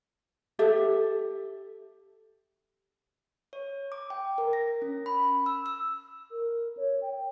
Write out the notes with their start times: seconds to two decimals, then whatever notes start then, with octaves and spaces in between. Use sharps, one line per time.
0.59 G4 A4 E5
3.53 C#5
3.92 D6
4.10 G5
4.38 A#4
4.53 A#6
4.82 C#4
5.06 B5
5.46 E6
5.66 E6
6.31 A#4
6.77 C#5
7.02 G5